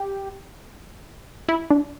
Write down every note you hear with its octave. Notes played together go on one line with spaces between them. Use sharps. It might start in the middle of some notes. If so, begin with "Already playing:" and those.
Already playing: G4
E4
D4